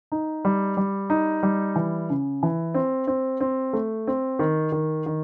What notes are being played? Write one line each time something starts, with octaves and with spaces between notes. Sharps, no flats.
D#4
G3
G3
D#4
G3
E3
C#3
E3
C4
C4
C4
A3
C4
D#3
D#3
D#3